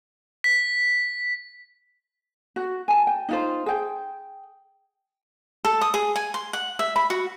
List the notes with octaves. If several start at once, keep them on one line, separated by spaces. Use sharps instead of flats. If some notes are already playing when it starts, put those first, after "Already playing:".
B6
F#4
G#5 A5
G5
D#4 F4 C5
G#4 G5
A4
D#6
G#4
G#5
C6
F#5
E5
B5
F#4